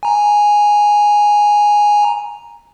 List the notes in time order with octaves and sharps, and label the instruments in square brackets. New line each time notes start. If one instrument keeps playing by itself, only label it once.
[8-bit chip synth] G#5 A#5